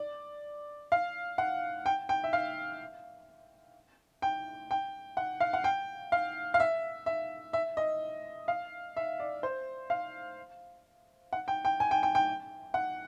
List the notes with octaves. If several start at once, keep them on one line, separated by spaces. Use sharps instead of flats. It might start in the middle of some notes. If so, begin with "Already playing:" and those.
Already playing: D5
F5
F#5
G5
G5
E5
F5
G5
G5
F#5
F5
F#5
G5
F5
F5
E5
E5
E5
D#5
F5
E5
D5
C5
F5
F#5
G5
G5
G#5
G5
G5
G5
F#5